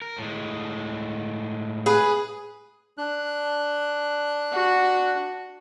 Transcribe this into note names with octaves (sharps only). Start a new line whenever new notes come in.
A#4
A2 G#3
G#4 B4
D4 F#6
F#4